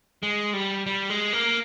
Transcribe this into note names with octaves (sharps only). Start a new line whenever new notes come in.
G#3
G3
G3
G#3
A#3